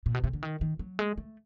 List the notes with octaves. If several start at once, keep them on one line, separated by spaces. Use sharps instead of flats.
A#2
B2
C3
D3
D#3
D#3
F#3
G#3
A3